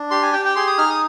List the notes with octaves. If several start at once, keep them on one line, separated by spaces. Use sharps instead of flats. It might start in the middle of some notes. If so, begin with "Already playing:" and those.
Already playing: D4
G4 C6
G#5
G4 G5
G5
G#4 C6
D#6
D#4 F6
D#6